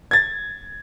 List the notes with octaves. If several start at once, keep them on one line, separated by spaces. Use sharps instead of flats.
G#6 A6